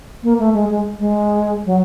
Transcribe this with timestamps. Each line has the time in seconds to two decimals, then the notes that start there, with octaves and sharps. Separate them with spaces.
0.23 A#3
0.39 A3
0.54 G#3
0.69 G#3
1.00 G#3
1.66 F#3